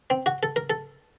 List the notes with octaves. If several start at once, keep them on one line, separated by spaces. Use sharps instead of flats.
C4
F#4
A4
A#4
A4